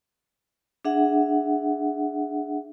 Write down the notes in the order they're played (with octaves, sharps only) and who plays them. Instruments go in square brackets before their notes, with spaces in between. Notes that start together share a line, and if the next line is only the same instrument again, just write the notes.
[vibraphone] D4 G#4 E5 F#5